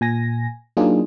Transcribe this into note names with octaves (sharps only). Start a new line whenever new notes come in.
A#2 G#5 A#6
F#3 A#3 D4 D#4 F4 G#4